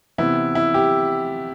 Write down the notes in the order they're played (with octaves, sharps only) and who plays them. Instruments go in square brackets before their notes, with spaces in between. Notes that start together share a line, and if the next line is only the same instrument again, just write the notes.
[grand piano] C3 E3 B3 E4
E4
G4